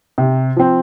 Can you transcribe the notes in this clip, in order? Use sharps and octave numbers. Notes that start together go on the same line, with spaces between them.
C3
F3 C4